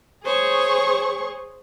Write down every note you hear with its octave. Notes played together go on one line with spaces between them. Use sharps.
G#4 C5 C#5 C#6